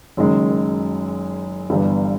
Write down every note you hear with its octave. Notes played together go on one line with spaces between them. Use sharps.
F#1 F#2 D#3 G#3
G1 G2 E3 G3 B3